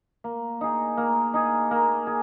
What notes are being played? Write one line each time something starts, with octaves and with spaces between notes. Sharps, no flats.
A#3
D#4 G#4
A#3
D#4 G#4
A#3
G#4